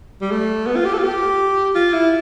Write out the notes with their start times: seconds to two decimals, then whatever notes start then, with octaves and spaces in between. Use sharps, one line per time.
0.22 G3
0.31 A3
0.67 B3
0.76 F4
0.85 G4
0.94 A4
0.99 F4
1.03 G4
1.75 F4
1.93 E4